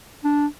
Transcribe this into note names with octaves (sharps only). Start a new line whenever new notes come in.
D4